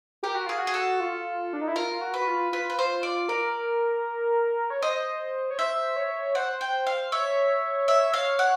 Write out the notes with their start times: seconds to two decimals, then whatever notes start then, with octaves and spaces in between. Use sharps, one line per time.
0.23 G4 A#4
0.35 F#4
0.46 F4 G#4
0.58 F#4
0.67 G#4
0.74 A4
1.00 F4
1.53 D4
1.61 D#4
1.68 E4
1.75 F4 A#4
1.91 F4
2.01 F#4
2.14 B4
2.21 F#4
2.28 F4
2.52 F4 B4
2.70 B4
2.79 C5
3.03 D5
3.29 A#4 D5
4.70 C#5
4.82 C5 D#5
5.51 C#5
5.58 C5 E5
5.96 C#5
6.35 C5 F#5
6.61 G5
6.87 F5
7.12 C#5 E5
7.88 E5
8.14 F5
8.39 F#5